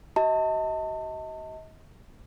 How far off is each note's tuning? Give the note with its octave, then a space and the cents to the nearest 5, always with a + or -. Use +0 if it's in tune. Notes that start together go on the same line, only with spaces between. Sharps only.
F#4 +45 D#5 +35 A5 +30